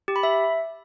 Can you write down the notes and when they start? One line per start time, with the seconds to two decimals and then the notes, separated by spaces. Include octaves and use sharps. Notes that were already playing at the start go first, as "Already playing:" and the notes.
0.08 G4
0.16 B5
0.23 E5